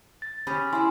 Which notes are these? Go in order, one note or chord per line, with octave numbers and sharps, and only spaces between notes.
A6
C#4 G4 G#4 B5
E4 E5 G#5 C6